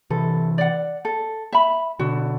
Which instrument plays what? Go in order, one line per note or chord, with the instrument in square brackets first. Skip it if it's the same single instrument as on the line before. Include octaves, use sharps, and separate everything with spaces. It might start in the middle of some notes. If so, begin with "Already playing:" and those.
[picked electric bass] C3 E3 [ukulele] A4
[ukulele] D5 F#5
A4
E5 B5
[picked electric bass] B2 D3 [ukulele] F#4